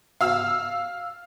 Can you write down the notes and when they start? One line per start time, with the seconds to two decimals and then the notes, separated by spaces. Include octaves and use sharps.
0.21 F5 E6 F6